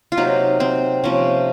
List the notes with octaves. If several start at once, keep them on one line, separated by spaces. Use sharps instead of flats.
F4
C3 F#3 A#3 D#4
C4
C3 F3 A#3 C#4